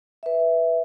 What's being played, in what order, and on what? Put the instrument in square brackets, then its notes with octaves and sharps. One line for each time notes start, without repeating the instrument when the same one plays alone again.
[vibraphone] B4 E5